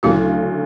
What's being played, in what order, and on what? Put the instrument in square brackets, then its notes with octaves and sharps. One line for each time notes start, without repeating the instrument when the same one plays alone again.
[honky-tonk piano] D2 C#3 F#3 [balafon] E4 F#4